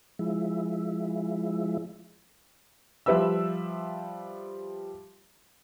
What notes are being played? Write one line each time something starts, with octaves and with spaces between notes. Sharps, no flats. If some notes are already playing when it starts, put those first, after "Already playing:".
F3 G#3 E4
F3 G3 B4 E5 E6